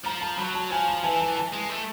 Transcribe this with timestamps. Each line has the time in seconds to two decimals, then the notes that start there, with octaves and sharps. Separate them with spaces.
0.05 F3 A#5
0.21 A5
0.38 F#3 B5
0.55 A5
0.71 F3 G#5
0.88 A5
1.03 E3 G#5
1.21 A5
1.37 A5
1.53 G#3
1.70 A3